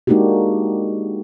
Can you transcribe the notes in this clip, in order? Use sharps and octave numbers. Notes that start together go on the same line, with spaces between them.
G#3 A#3 D4 D#4 F#4 G4